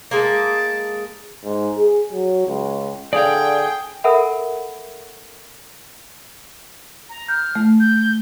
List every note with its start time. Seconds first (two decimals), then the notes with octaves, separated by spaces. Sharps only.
0.11 G#3 A#3 A5 D6
1.44 G#2
1.78 G#4
2.13 F#3
2.47 C#2
3.13 D3 G#4 D5 F5 G5
4.04 A4 A#4 E5 F#5 B5
7.09 A#5
7.28 F6 G6
7.55 A3
7.80 G6